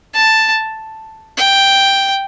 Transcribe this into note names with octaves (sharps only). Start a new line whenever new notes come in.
A5
G5